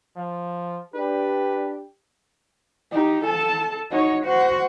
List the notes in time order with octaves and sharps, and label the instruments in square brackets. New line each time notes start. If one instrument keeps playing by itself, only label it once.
[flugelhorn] F3
[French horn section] D4 G4 [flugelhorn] B4
[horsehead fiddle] D#4 G4
A4 A5
[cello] D#4 [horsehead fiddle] F#4 C#5
[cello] F#4 [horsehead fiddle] C5 F#5